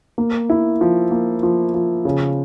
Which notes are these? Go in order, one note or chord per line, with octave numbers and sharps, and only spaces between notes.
A#3
E4
F3
A#3
F3
F3
C#3